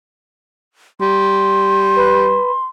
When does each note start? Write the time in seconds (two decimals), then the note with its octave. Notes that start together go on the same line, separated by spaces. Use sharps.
1.00 G3 C6
1.96 B4